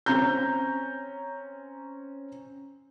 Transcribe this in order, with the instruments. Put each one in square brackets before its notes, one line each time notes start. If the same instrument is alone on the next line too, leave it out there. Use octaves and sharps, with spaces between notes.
[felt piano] C4 C#4 A#5 G6